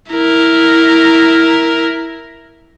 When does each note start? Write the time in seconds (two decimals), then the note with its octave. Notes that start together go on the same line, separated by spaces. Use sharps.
0.11 E4 A#4